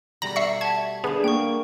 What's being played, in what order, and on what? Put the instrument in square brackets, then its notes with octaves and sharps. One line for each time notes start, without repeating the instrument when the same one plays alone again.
[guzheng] B2 G3 A3 [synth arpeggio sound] A#5 [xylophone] F#7
[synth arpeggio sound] E5 C#6 [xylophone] C7
[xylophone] E5 F#5 A5 [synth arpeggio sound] G#6
[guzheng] D3 C5 [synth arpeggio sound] B3 [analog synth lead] G#4
[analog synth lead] A#3 [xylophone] G5 C#6